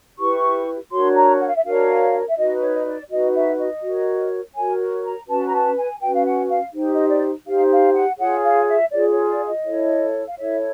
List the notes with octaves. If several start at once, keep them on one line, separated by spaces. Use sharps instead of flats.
E4 G4 B4 C#6
D4 F#4 A#4 C#5 C6
A#5
F#5
F5
E5
D4 F#4 A#4 C#5 F5
E5
D#4 F#4 B4 D#5
C#5
D#5
D5
D#4 F#4 B4 D#5
E5
D#5
F#4 A#4 C#5
F#4 A#4 C#5 G#5
A#5
C#4 F#4 B4 A5
A#5
A5
G#5
C#4 F#4 B4 G5
F5
F#5
F5
D#4 G4 C5
D#5
D5
D#4 G4 C5 F5
F5
F#5
F4 G#4 C#5 F#5
F5
E5
F4 G#4 C#5 D5
C#5
D5
D#5
E4 A4 C#5
F5
E4 A4 C#5 E5